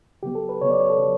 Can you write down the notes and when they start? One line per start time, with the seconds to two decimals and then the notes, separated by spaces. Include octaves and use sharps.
0.23 C#3 F#3 B3 G4
0.35 A4
0.49 B4
0.61 C#3 F#3 B3 C#5
0.70 D5
0.80 C#5
0.90 A4
0.98 C#3 F#3